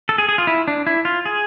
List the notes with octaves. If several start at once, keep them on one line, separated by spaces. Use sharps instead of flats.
A4
G#4
G#4
F4
E4
D4
E4
F4
G#4